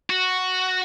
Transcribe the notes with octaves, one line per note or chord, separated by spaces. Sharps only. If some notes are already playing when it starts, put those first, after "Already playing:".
F#4